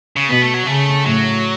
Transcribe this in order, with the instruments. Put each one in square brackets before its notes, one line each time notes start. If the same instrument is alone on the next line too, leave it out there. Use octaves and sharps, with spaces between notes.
[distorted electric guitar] C#3
[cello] B2 [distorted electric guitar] B3
[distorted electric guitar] A3
F#3
[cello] C#3 [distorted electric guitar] A3
[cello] A2 [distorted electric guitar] F#3